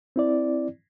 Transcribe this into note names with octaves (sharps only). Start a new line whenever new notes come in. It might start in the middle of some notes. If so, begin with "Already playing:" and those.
C4 E4 D5